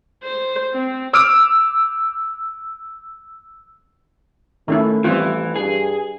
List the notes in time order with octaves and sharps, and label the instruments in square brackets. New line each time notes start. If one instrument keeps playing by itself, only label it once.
[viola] C5
C4
[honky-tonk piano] D6 E6 F6 D7
[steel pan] D#3 C#4 E4 [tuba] A3
[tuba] A1 [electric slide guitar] E3 [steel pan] G3 C4 F4
[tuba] G2 [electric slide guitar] G#4